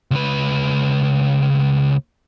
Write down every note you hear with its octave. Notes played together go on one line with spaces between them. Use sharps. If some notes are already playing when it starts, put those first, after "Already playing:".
C#2 B4